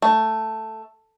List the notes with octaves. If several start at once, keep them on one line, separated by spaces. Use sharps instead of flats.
A3